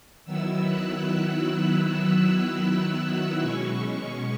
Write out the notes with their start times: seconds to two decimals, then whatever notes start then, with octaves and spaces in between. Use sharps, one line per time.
0.25 D#3 F#3 B3 E4 E6
0.64 F#6
1.83 E6
2.22 E6
3.40 B2 G#3 C#4 C#6
3.80 C#6